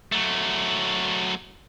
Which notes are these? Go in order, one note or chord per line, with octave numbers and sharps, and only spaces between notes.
F#3 A3